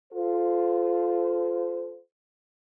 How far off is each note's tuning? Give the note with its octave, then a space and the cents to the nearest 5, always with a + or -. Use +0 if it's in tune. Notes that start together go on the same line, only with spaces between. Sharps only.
F4 +0 A4 -25 C5 -25